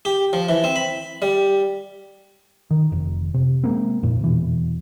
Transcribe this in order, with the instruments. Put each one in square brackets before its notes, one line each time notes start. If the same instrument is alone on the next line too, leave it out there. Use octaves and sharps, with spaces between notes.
[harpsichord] G4
F3
E3
C4
B5
G3
[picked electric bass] D#3
F1
C3
G#3 A#3 C4
F2 A#2
E1 B2 E3